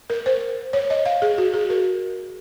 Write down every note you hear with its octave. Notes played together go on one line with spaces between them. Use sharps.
A#4
C5
C#5
D#5
F5
G#4
F#4
G#4
A#4